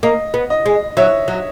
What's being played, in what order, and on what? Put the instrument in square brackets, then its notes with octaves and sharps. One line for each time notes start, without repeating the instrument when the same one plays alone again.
[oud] A#3 [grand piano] D#5
[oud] B3
[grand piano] D#5
[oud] G#3
[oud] F#3 [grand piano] C#5 E5
[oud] F#3